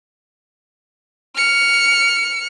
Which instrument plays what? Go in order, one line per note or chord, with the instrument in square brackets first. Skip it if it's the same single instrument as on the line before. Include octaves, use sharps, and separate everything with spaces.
[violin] F6 C#7